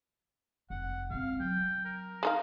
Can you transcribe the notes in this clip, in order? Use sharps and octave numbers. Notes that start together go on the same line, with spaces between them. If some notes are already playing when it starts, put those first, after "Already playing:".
F1 F#5
C#3 C4 F5
F#3 G5
A#4
G#3 D#4 F5